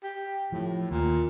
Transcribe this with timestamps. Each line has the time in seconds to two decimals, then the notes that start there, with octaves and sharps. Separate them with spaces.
0.03 G4
0.52 A2 F3
0.91 D#2 A#2